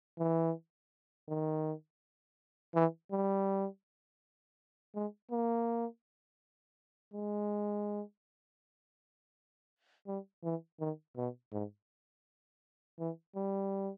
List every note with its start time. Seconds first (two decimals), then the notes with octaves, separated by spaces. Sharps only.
0.19 E3
1.29 D#3
2.75 E3
3.12 G3
4.95 G#3
5.31 A#3
7.14 G#3
10.07 G3
10.44 E3
10.80 D#3
11.17 B2
11.53 G#2
12.99 E3
13.36 G3